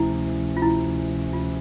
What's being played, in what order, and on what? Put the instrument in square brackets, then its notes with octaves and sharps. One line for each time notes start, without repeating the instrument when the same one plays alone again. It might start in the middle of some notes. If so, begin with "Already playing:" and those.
Already playing: [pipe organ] D2 C3 F3 A3 C#4 [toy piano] E4
[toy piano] F4
E4
F4